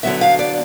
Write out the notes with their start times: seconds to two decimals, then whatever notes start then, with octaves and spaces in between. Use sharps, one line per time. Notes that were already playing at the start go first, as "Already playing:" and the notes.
0.03 D3 F#3 B3 E5
0.21 F5
0.39 D5